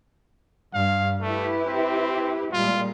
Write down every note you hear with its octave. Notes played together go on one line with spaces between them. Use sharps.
G2 F5
A3 E4 G4 B4
C4
A#2 G3 G#3 F4